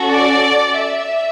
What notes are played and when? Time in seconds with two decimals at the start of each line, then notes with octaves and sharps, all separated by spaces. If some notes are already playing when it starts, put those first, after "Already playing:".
Already playing: C#4 F#4 A4
0.10 D5
0.76 E5